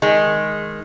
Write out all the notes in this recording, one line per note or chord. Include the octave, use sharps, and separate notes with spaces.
D#3 G#3